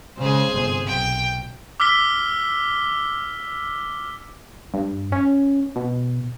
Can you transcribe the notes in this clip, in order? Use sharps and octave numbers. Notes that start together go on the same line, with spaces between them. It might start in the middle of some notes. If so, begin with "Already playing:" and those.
C#3 G#3 G#4 C5
G1 C3
B1 G5
D6 E6 F6 B6 G7
G2
C#4
B2